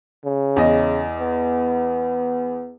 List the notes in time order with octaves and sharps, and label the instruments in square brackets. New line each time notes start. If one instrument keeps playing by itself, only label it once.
[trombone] C#3
[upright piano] E2 D#5
[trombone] B3